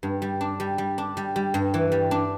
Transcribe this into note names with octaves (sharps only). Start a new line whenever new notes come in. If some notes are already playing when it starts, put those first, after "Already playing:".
G2
G3
D4
G3
G3
D4
G3
G3
G2
E3
G3
D4